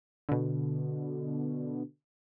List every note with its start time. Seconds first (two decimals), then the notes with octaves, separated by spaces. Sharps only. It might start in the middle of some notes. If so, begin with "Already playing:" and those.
0.29 B2 D3